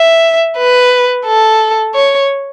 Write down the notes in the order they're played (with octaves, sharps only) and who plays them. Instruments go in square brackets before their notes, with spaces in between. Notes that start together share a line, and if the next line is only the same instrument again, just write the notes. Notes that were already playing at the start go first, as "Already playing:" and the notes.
Already playing: [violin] E5
B4
A4
C#5